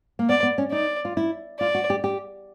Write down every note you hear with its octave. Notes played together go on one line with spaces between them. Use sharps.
A#3
B3 D5
B3
C#4
D#4 D5
F4
E4
F4 D5
F#4
G4
G4